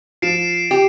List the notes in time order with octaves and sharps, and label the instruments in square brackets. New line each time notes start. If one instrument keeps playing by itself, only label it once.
[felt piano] F3 [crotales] C7 D7 E7
[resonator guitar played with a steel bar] G4